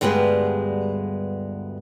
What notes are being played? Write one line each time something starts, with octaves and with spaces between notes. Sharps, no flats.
D2 G2 G3 G#3 B3 B4